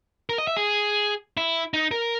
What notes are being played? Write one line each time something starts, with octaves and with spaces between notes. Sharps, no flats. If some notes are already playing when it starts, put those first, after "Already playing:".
A#4
D#5
E5
G#4
E4
D#4
A#4